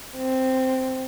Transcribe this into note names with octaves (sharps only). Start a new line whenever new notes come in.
C4